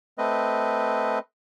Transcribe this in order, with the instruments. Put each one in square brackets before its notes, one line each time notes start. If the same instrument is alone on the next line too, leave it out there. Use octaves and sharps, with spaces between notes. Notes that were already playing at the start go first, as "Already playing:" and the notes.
[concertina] A3 C4 B4 D#5